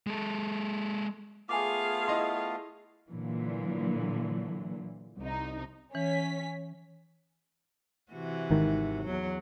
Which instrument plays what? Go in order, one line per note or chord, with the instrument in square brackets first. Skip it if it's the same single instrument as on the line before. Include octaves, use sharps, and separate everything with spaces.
[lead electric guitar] G#3 A4
[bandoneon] A3 B3 F4 [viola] G#4 F5 [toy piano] G#5 D6
[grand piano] E4 D#5 C6
[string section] A#2 D3 E3 F#3
C2 D#4
[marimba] E3 [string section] C#4 B6
[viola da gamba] C3 E3 F#4
[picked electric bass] G#1 D#3
[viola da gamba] E2 F#3